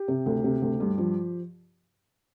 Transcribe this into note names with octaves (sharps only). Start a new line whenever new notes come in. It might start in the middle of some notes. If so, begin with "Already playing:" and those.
Already playing: G4
C3
D2
C3
D2
G2
F3